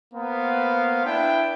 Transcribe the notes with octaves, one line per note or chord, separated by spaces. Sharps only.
A#3 B3 C5 F5
D4 E4 B4 G5